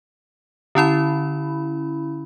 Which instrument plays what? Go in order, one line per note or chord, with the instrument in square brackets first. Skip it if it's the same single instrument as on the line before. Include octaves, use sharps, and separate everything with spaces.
[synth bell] D3 C#4 E4 B5